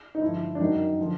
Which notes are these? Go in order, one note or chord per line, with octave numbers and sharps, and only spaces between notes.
D#4
G2 D3 F3 E4
D4
F#2 D#3 F#3 D#4
D3 F3